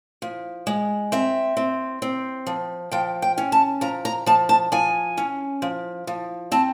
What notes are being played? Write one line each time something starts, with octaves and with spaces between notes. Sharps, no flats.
F3
G#3
C4 E5
C4
C4
F3
F3 G5
G5
C#4
A5
F3 A#5
A#5
F3 A5
A5
F3 G#5
C#4
F3
F3
C4 A5